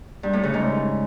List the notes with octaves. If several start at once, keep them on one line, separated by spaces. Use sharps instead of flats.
G2
A2
C#3
G#2